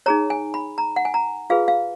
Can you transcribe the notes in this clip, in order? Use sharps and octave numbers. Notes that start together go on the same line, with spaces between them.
D#4 G#4 C#5 A#5
G#5
B5
A#5
F#5
G#5
A#5
F4 G#4 B4 F5
F5